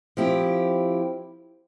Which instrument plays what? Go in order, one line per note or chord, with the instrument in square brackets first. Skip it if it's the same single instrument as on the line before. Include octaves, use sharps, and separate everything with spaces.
[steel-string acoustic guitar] F3 C4 E4 G4